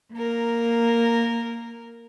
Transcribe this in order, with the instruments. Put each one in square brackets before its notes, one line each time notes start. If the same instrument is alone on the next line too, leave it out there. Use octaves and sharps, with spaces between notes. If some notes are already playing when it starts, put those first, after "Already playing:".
[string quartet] A#3 A#4